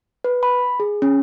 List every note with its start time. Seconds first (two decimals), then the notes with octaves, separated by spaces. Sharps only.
0.24 B4
0.43 B5
0.80 G#4
1.02 C#4